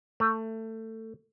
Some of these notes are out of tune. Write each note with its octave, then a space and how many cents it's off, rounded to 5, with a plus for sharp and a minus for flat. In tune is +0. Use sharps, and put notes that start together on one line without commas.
A3 +20